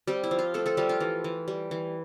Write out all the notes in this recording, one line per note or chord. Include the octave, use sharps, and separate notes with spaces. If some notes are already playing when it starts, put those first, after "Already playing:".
G3 C4 G4
E4
F3
F4
A3 C4 A4
A3 A4
F3 G3 G4
F4
E3
E3
G3
E3